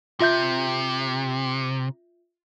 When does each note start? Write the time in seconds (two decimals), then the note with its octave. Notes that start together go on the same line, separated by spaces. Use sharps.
0.20 C3 F4 E5 G6